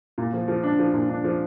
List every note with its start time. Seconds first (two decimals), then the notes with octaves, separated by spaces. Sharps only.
0.18 A#2
0.33 F3
0.48 F3
0.63 D4
0.79 F3
0.94 A#2
1.09 D4
1.24 F3